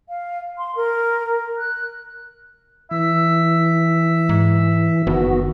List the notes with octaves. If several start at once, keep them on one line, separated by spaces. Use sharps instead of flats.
F5
C6
A#4
F#6
E3 E5
G#2
F#1 D#3 B3 F#4